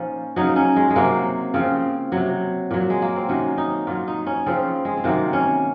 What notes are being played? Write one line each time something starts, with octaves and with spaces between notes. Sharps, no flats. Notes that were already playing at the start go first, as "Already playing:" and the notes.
Already playing: A#2 F3 C#4 D#4
C#3 F#3 D#4
C#4
G#3
G#3
C3 F#3 A#3
C#3 F3 C4
C3 F#3
A#2 F#3
G#3
A#3
C4
C3 D#3 F#3 C#4
D#4
A#2 F#3 F4
D#4
C#4
C#3 F3 C4
G#3
C4
C3 D#3 F#3 A#3
C#4